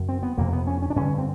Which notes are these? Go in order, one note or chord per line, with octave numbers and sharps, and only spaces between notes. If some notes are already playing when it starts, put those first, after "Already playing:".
Already playing: F#2 C#3
C4
B3
F2 C3 A#3
B3
C#4
C#4
D4
G2 D3 C#4
C4